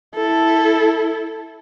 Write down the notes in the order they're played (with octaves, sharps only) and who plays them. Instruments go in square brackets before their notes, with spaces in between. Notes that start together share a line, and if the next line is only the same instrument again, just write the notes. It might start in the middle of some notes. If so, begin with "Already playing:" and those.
[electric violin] E4 A4